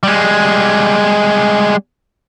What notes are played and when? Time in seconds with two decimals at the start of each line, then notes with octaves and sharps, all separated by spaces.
0.03 G3 G#3